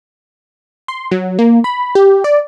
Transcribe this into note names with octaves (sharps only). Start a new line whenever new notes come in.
C6
F#3
A#3
B5
G4
D5